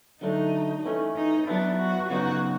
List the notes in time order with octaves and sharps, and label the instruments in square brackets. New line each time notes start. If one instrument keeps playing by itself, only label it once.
[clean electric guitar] D3 F#3 A3 D4 [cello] D#4
[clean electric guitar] E3 A3 C#4
[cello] D#4
[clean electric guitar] F#3 B3 E4 [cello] D4
[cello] F#4
[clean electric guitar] C#3 F#3 B3 D#4 [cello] F#4